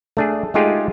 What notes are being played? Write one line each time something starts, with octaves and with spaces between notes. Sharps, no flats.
A3 D4 G#4
G#3 A3 D#4 F4 G4 G#4